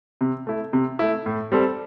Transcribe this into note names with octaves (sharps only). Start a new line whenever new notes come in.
C3
A3 E4
C3
A3 E4
A2
G3 C4 A4